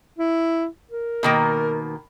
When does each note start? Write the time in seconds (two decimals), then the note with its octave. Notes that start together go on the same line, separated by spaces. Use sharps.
0.19 E4
0.91 A#4
1.23 B2 D#3 A#3